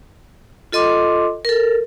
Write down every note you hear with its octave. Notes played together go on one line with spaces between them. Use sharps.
F4 A4 D#5 C6 D6
A4 A#4